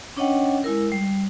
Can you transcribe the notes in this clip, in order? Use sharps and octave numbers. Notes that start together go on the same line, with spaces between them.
C#4 D4 C#5 D#5 F#5 G5
G#3 E4 A#4
G3